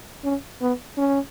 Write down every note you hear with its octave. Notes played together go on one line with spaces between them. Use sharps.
C#4
B3
C#4